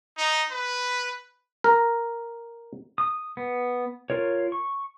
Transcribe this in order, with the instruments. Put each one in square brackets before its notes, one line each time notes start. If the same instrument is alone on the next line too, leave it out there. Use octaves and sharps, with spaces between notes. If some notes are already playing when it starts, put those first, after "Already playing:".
[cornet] D#4
B4
[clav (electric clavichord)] A#4
[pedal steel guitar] D#6
B3
F4 A#4 C#5
C#6